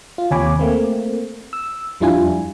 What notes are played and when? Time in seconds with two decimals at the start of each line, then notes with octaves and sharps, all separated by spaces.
0.18 F4
0.31 D#2 C3 C#5 G#5 B5 D6
0.59 A3 A#3 C4
1.53 E6
2.01 F2 G3 D4 E4 F4 G#5